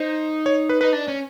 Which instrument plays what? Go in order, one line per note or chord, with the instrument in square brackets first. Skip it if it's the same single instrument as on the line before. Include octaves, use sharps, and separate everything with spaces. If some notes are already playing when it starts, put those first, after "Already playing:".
Already playing: [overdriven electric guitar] D#4 [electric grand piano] C5
[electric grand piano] C#5
B4
[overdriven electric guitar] D#4 [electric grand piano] B4
[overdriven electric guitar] D4
C#4